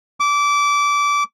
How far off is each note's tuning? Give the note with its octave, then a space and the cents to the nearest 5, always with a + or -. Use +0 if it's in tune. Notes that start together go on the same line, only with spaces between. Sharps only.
D6 -20